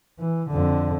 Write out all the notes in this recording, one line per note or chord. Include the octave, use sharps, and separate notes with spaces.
E3
F2 D3